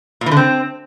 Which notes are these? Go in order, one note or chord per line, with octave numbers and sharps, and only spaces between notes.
A#2
E3
D3
C4